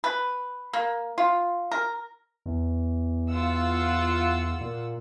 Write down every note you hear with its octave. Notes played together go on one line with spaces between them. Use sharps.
B4
A#3
F4
A#4
E2
F4 F#5 E6
A#2